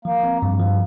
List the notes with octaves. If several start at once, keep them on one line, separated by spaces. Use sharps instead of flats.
F3 A#3
C4
G2
F3